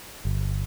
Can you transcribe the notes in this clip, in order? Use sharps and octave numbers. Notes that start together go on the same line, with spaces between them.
G1